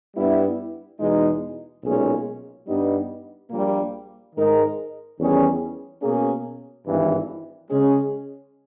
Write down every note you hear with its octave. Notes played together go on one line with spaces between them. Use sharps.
G2 G3 B3 E4
E2 B2 G#3 D#4
B1 A#2 G#3 C#4 G#4
G2 G3 B3 D#4
A#1 A#2 G3 A#3
G#2 D#3 G#3 D#4 A#4
E2 D#3 G3 C#4 G#4
B2 A#3 C#4 G#4
G#1 G2 E3
C#3 G#3 C#4 G#4